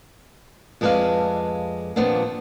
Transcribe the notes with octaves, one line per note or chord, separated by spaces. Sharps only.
F2 G#3 A4 B4 D5 F5
D#2 A#2 F3 B3 C4 D4